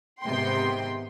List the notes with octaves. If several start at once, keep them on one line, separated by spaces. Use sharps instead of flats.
G#2 C3 D#3 B3 G5 C6